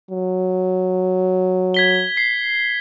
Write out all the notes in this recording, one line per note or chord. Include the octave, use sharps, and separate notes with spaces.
F#3
G#6 B6 G7
C7